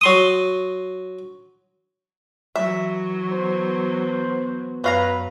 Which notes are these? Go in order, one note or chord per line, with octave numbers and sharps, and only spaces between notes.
F#3 C6 D#6
E3 F#3 E5
B3 C5
F#2 F#3 B4 F5 A#5